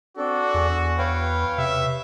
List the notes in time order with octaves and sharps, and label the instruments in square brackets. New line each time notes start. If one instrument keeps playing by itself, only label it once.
[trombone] C4 [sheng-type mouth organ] D4 A4 [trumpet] F#4
[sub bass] E2 [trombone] G#4
[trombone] B4 [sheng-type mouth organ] C#5 F5 G5
[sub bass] C3 [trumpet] E5